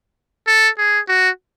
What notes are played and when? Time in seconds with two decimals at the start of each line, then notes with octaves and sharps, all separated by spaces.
0.47 A4
0.78 G#4
1.08 F#4